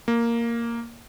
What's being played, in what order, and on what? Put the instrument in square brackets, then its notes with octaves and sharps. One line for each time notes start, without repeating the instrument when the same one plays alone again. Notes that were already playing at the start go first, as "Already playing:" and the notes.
[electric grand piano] A#3